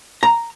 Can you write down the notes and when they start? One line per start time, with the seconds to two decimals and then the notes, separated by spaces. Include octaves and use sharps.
0.23 A#5